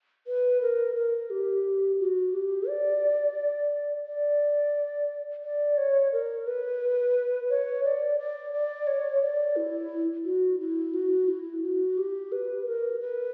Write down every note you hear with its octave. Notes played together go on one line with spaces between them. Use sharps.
B4
A#4
A#4
G4
F#4
G4
D5
D5
D5
C#5
A#4
B4
C#5
D5
D5
D5
C#5
D5
E4
F#4
E4
F#4
E4
F#4
G4
B4
A#4
B4